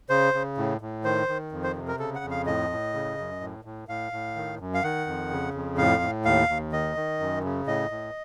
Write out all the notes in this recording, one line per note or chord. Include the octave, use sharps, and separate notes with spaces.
C#3 C5
C#3
A2
A2
D#3 C5
D#3
F2
C5
C3
A#4
C#3 A4
F#5
F2
F5
A2 D#5
A2
C#3
F#2
A2
A2
A2 F5
A2
D#3
F#2
F5
D#3 F#5
F2
C#3
F2
A2 F5
A2
D#2 F5
D#2
D#3 D#5
D#3
F#2
C#3
A2 D#5
A2